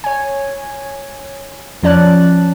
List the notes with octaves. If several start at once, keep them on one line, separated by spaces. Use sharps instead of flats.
C#5 G#5
F2 F3 C#4 D5 A5 F#6